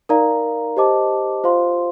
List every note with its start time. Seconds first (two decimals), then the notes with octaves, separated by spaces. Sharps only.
0.09 D#4 A#4 D5 F5 A#5
0.77 G4 C5 D#5 A5 D6
1.44 F4 C5 F5 C6